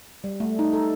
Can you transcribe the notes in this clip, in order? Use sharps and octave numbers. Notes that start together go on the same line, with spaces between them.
G3
A3
D#4
A4